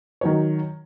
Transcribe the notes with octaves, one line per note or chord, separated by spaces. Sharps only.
D#3 F#3 C#5